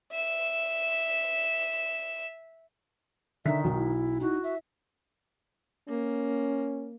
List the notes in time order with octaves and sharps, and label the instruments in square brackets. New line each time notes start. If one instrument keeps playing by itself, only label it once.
[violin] E5 E7
[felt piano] D3 B6 [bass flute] D#3 [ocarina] E5
[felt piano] B1 [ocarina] F#4
[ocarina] E4
[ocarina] D#4 [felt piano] E4 [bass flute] F#4
[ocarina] E5
[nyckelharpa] A#3 [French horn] C#4